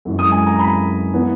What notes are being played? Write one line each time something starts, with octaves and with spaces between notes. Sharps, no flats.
F#2 E3 G#3
D#6
G#5
A#5
B5
E3 B3